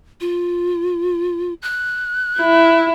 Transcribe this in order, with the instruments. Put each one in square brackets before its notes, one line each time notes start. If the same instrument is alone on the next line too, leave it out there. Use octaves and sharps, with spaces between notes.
[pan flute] F4
F#6
[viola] E4